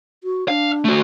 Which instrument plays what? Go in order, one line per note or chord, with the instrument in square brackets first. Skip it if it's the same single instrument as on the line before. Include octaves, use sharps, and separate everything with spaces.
[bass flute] F#4
[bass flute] D4 [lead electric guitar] F5
[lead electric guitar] A3 F#4